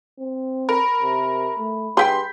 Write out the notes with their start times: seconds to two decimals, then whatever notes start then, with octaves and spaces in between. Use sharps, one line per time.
0.19 C4
0.69 A#4 B5
1.02 C3
1.58 A3
1.97 G2 G#4 F#5 G5 C6 G6 B6